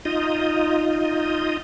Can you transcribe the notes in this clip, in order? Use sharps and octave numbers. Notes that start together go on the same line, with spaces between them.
D#4 F4 D#5